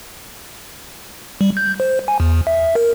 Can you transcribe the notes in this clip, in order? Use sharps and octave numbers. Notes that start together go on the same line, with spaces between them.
G3
G6
C5
G#5
E2
E5
A#4